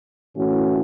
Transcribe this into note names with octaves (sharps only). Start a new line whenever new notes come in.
A2 E3 A3 C#4 F#4